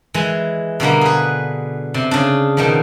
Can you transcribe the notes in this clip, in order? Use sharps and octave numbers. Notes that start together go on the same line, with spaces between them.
E3 G#3 G#5
B2 D3 G3 A#3
G#4 B4
C3
C#3 D4
B2 D#3 F3